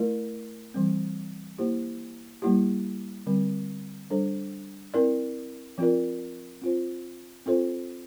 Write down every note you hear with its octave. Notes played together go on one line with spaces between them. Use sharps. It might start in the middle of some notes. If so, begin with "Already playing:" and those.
Already playing: A3 E4 A#4 D5
E3 G3 C4
A#3 E4 G4 C5
G3 A#3 E4 G4
D3 G3 C4
G3 D4 A4 C5
C4 E4 A#4 D5
F3 C4 F4 A#4 D5
C4 F4 C5
C4 F4 A4 C5